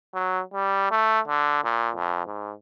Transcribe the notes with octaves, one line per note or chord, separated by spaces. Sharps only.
F#3
G3
A3
D3
A#2
F2
G#2